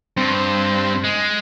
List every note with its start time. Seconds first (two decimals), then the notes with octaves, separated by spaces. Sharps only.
0.17 G2 C4
1.05 G#3